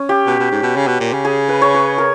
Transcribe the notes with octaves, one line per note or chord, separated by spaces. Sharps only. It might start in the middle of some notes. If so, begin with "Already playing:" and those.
Already playing: C#4
G4
B2
B2
G#2
B2
C#3
B2
A#2
C#3
G#4
B4
C#5
B4
A#4